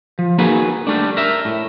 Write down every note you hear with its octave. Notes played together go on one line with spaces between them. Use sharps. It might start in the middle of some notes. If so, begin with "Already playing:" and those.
F3
A#3 D#4 F#4 G#4 B4
G3 A3 D4
A#4 E5
A2